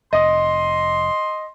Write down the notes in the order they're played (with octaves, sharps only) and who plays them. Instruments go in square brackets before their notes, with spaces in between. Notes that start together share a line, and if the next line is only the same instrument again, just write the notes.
[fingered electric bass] F1 [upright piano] D#5 [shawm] C6